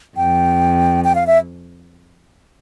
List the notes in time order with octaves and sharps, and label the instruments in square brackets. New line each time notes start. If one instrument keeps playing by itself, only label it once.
[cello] F2 [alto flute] G5
[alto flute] G5
F5
E5